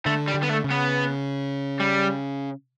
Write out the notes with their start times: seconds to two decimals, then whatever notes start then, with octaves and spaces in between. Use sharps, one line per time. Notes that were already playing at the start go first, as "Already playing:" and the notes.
0.06 D3 A3
0.28 G3
0.34 D3
0.43 B3
0.50 A3
0.64 C#3
0.71 B3
1.80 G3